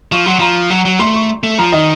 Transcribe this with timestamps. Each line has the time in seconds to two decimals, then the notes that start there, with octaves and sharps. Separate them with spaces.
0.11 F3 C#6
0.26 F#3 C6
0.39 F3 A#5
0.70 F#3
0.85 F#3
0.99 A3 C6
1.14 C#6
1.43 A3
1.58 F3 A#5
1.72 D#3 D#5